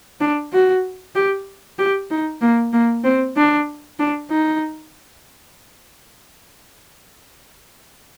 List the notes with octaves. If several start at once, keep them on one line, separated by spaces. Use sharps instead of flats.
D4
F#4
G4
G4
D#4
A#3
A#3
C4
D4
D4
D#4